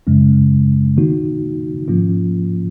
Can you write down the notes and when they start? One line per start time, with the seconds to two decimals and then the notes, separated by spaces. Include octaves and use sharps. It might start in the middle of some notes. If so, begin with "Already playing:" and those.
0.07 F#2 C#3 G#3 C#4
0.97 D#3 A#3 D#4 F#4
1.88 G#2 F3 A#3 C#4 F4